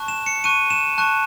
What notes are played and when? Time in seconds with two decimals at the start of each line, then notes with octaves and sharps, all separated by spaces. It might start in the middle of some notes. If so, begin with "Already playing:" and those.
Already playing: A5 C#6 F#6
0.08 E7
0.26 C#7
0.44 A5 C#6 F#6 D#7
0.70 E7
0.98 A5 C#6 F#6